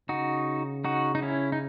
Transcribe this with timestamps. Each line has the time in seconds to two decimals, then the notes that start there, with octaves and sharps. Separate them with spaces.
0.09 C#3 D#4 F#4
0.85 D#4 F#4
1.15 D#4
1.22 C#4 E4
1.52 D#4